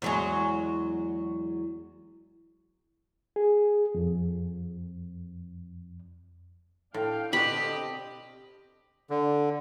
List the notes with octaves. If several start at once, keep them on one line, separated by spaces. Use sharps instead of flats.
E2 F#3 G#3
G#4
F2
A2 D4 F5 G5
B2 D3 C4 F#4 G4 D#5 B5
D3